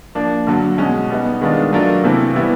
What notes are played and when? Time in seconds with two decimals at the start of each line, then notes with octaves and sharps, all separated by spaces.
0.15 F3 A#3 D4
0.47 G2 D3 F#3
0.78 B2 G#3 C#4
1.10 G3 B3 D#4
1.42 D#3 G#3 B3 D4 F4
1.73 F#3 A3 D4 F4 A#4
2.04 C3 E3 A3 C4 E4
2.35 E3 G3 B3 E4